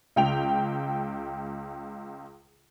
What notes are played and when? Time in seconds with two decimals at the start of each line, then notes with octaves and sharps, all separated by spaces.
0.16 C#2 G5 F7